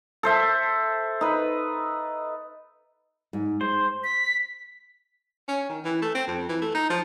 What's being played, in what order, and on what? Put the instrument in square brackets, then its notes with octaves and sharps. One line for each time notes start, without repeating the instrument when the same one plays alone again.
[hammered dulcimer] A4 C5 E5
D#4 B4
[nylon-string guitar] G#2
[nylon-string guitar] G#3 [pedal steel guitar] C5
[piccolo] B6
[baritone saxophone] C#4
D#3
E3
A3
C4
F2
E3
A3
D#4
F3